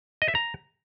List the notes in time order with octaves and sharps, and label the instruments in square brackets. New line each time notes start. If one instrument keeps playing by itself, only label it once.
[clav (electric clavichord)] D#5
E5
A#5